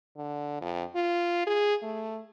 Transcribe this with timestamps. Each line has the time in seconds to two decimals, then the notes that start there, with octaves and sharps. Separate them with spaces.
0.17 D3
0.61 F2
0.96 F4
1.47 G#4
1.83 A3